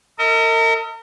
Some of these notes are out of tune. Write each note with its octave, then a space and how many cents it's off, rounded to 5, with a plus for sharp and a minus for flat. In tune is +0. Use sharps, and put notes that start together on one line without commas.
A#4 -40 D#5 +40